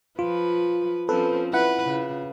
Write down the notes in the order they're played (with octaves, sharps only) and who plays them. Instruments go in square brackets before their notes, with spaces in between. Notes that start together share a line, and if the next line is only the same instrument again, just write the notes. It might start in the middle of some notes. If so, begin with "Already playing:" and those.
[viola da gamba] F3 B4 [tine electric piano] F4
[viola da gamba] F3 C4 C#4 [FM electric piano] A4 B4
[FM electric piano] E4 F#5 [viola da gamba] B4
[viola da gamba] C#3